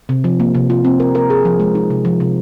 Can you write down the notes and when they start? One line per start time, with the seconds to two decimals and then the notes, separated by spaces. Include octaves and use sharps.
0.09 C3
0.24 F3
0.40 A#3
0.55 C3
0.70 F4
0.85 C4
1.00 A#4
1.15 A#4
1.30 G#4
1.45 F3
1.60 G#3
1.75 D#4
1.90 C3
2.05 F3
2.20 C3